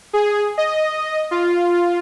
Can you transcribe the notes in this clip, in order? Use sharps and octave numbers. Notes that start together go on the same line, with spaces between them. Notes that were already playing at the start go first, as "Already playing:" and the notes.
G#4
D#5
F4